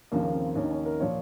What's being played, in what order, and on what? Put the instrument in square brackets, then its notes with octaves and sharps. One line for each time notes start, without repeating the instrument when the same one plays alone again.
[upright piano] D#2 C#3 F3 A#3
A#3
C4
D#2 D#3 C#4
D#4
C#4
A#4
A#2 F3 C#5